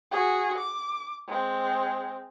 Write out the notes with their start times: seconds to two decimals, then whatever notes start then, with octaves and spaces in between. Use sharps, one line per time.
0.11 F#4 G#4
0.58 D6
1.28 G#3 C4